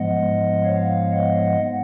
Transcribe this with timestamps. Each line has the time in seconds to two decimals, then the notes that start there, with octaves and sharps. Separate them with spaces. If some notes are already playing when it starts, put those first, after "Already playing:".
Already playing: G#2 F3 G#3 B3 D#5 F#5
0.64 C#5 F5
1.11 D#5 F#5